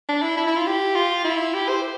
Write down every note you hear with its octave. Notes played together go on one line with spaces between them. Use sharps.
D4
E4
E4
E4
F4
G4
F4
E4
G4
C5